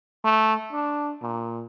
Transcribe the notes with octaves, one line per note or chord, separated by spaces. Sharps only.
A3
D4
A#2